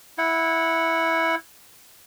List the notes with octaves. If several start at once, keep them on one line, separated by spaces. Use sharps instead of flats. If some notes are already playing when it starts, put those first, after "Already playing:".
E4 F#5